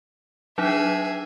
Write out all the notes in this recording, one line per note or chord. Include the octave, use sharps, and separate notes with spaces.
F#3 D4 D#4 G#4 E5